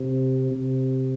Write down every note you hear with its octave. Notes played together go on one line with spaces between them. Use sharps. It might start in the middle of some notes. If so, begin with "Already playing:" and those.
Already playing: C3
C3